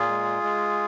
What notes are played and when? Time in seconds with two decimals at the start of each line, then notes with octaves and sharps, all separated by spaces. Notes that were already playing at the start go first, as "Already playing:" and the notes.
Already playing: A#2 F4 G#4
0.09 G#3
0.44 G#3